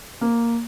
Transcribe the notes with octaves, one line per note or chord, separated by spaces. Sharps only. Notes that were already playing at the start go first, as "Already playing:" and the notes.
A#3